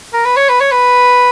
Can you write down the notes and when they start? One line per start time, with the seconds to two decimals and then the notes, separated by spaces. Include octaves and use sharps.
0.13 A#4
0.25 B4
0.36 C#5
0.49 B4
0.60 C#5
0.72 B4